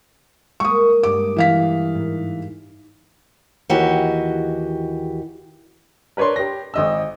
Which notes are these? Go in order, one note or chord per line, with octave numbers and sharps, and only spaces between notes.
G#3 A#3 C#6 D#6
G2 D6
E3 F5 B6
G#2
D#2 E3 F#4 G4 D#5
A#4 B4 C#5 D5 C6
G4 A#6
G#1 D#5 E6